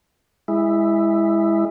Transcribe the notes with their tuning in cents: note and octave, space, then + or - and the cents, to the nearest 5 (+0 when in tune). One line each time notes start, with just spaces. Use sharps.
G#3 -20 E4 +0